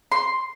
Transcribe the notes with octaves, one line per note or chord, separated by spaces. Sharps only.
C6